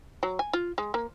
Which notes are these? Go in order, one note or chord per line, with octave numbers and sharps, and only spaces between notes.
F#3
G#5
F4
G#3
A#3